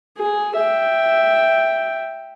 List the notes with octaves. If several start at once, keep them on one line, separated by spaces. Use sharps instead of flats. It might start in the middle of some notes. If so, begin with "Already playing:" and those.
G#4
E5 G5